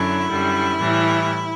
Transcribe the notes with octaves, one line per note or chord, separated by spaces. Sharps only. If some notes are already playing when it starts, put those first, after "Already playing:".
Already playing: F#2 D3 F#3 E4
F#2 D3 G3
A2 E3 G3